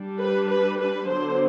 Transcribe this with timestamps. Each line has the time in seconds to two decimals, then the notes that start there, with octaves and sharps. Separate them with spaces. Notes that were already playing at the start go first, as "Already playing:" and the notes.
Already playing: G3 D4
0.20 B4
0.49 B4
0.79 B4
1.08 D3 F#3 B3 D4 C5